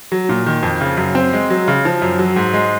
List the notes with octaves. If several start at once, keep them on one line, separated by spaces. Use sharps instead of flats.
F#3
A#2
D#3
F2
C#3
F#2
C4
G#3
F#3
C#3
F3
F#2
F#3
G#2
G#3